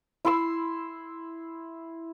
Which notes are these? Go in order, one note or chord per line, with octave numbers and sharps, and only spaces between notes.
E4 C6 E6